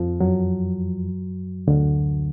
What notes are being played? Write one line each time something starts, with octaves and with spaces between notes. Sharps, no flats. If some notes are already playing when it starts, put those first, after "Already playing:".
Already playing: F2 F3
F#2 F#3
D2 D3